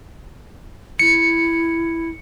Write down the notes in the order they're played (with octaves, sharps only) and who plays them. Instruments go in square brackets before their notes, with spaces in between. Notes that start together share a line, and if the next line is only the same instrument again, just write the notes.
[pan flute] E4 [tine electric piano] C#7